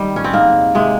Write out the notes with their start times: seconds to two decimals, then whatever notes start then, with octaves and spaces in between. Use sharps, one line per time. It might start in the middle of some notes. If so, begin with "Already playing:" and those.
Already playing: D#3 G3
0.16 C#4
0.24 C4
0.33 G#2 A#3
0.75 C3 G#3